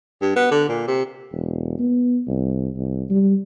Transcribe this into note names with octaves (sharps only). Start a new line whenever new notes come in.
G2
B3
D3
A#2
C3
E1
B3
C2
C2
G3